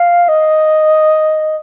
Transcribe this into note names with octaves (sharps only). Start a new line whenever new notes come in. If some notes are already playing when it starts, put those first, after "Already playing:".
Already playing: F5
D#5